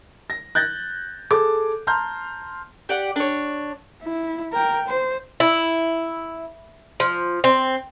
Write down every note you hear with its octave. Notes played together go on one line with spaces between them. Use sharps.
A#6
F#6 G6 A6 A#6
G#4 A4 D6
A5 A#5 C6 F6 G6
G4 D5 F#5
D4 C#5
E4
A#4 G5
C5
E4
F3
C4